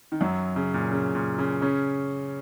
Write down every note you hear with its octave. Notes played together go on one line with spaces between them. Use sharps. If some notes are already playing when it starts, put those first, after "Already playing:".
D#3
F#2 F#3
C#3
A#2
C#3
A#2
C#3
C#3 C#4